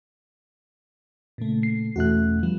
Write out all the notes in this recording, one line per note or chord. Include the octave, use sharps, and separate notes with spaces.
A#2 C#3 A3
C7
E2 B2 A3 C#4 F#4 F#6
F3 G3 B3